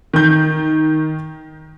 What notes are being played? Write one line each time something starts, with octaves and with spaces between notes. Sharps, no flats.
D#3 G6